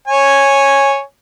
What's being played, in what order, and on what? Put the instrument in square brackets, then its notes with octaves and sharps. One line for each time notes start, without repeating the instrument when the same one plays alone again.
[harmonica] C#5 G#5